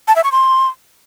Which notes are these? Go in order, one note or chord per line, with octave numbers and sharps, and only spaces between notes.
A5
E5
C#6
C6